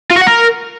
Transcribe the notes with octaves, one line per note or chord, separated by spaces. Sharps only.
F4
F#4
F#5
A#4